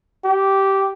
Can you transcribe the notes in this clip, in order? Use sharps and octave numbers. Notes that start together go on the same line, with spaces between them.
G4